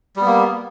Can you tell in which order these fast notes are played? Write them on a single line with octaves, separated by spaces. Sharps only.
G3 B3 A#3